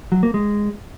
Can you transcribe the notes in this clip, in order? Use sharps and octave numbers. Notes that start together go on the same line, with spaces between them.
F#3
A#3
G#3